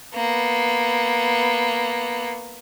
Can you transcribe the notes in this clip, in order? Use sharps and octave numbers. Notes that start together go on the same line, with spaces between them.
A#3 B3